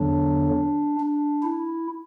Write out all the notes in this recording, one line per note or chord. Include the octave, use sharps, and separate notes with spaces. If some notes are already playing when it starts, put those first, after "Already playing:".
Already playing: E2 D3 F#3 D4
D4
E4